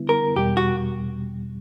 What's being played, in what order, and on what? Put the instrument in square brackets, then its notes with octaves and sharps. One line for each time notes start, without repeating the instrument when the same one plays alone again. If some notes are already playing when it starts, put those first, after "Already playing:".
Already playing: [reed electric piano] D3 G3 B3 E4
[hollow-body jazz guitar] A#4
[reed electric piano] E2 B2 G3 [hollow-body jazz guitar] G4
[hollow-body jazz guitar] F#4